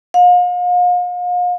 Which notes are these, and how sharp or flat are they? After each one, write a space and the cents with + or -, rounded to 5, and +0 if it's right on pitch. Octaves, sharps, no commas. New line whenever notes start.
F5 +40